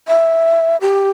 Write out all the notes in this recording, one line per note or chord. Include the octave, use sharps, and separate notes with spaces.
E5
G4